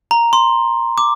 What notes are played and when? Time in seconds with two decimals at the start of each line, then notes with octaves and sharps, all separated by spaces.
0.11 A#5
0.33 C6
0.98 D6